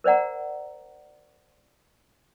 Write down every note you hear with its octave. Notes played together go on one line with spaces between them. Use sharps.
A#4 C5 D5 F#5 A#5